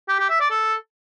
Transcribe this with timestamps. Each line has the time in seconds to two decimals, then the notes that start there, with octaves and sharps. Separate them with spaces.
0.08 G4
0.19 G4
0.29 E5
0.40 D5
0.50 A4